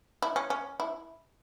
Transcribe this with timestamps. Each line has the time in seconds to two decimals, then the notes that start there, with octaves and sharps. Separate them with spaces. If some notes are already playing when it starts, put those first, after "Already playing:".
0.22 E4
0.36 C#4
0.50 C#4
0.80 E4